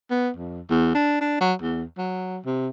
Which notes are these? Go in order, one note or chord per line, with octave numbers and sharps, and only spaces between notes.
B3
F2
E2
D4
D4
F#3
E2
F#3
C3